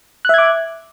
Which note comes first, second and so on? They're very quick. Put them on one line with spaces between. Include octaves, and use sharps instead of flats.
F#6 E5 G#6 D6